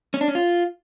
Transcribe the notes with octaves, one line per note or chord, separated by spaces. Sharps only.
C#4
D4
C#4
F4